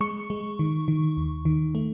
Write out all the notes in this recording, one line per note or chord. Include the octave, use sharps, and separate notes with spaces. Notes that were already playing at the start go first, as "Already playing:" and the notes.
G#3 C#6
G#3
D#3
D#3
D#2
D#3
A3